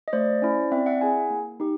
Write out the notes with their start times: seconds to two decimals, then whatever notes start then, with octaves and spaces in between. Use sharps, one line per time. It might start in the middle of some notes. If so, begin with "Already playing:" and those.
0.08 D#5
0.13 A3 C5 D5
0.42 C#4 E4
0.71 C4 D5 E5
0.86 E5 F#5
1.01 E4 G#4 F#5 G#5
1.30 A#3
1.60 D#4 G4